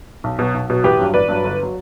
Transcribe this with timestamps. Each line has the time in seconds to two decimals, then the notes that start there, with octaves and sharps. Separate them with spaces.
0.24 B1
0.39 B2 F#3
0.55 B1
0.69 B2 F#3
0.84 A1 G4 B4
0.99 G2 F#3
1.14 A1 B4 D5
1.29 G2 F#3
1.44 G1
1.63 F#3